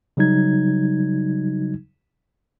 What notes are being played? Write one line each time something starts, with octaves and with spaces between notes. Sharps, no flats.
C#3 F#3 G3 D#4 G#6